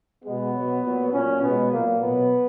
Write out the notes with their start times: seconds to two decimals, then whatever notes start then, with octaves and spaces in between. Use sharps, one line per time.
0.24 B2 G#3 B3
0.54 B2 F#3
0.83 A#2 F#3
1.13 A#2 F#3 C#4
1.42 B2 G#3 B3
1.71 A#2 F#3 A#3
2.01 B2 F#3 B3